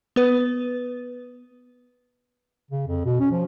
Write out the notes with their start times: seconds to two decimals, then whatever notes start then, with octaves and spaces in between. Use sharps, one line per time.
0.16 B3 B4
2.71 C#3
2.87 F2
3.05 B2
3.20 C#4
3.32 F3